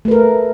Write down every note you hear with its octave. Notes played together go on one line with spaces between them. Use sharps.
A3 A#4 B4